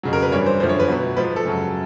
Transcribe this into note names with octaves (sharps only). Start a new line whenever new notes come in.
F2 C#3 F#3
A#4
B4
G2 E3 G3 C#5
C5
F#2 D3 F3 C5
C#5
B4
B2 F#3
G#2 F3 B4
A4
F#2 C#3 F#3